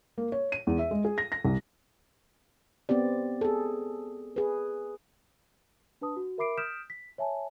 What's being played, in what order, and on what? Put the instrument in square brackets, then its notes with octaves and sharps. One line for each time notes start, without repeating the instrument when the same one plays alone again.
[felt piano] A#3
C#5
D#7
E2
E5
G#3
G#4
A#6
A#6
C2
[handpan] B3 C4 G4 D5
G#4 A4
G#4 B4
[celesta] D4 B4 A5 D#6
F#4
A#4 E5 B5 D6 C7 D7
D#6 F6 G6 B6 D7 E7
B6
C#5 E5 G#5 A5